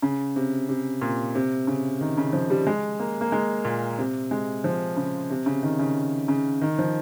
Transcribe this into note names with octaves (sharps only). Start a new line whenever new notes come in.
C#3
C3
C3
A#2
C3
C#3
D#3
C#3
F3
G3
G#3
A#3
A#3
G#3
A#2
C3
G#3
F3
C#3
C3
C#3
D#3
C#3
C#3
D#3
F3